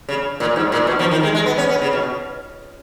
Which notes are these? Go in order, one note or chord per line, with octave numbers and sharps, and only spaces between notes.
C#3
A#2
G#2
A#2
B2
F3
D#3
G#3
G#3
B3
C#4
B3
C#3
B2